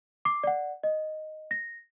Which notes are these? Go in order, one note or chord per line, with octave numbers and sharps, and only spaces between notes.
D6 C7
D5 F#5
D#5
A#6